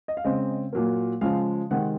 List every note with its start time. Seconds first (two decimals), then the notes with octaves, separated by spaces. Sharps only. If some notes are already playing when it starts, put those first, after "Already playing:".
0.08 D#5
0.17 F5
0.24 C#3 G#3 C4 D#5
0.73 A#2 F#3 A#3
1.21 C#3 F3 G#3 F5
1.70 C3 D#3 G#3 C4 F#5